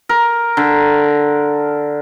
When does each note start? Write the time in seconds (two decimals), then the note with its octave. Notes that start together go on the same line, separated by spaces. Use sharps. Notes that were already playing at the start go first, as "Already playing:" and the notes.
0.09 A#4
0.57 D3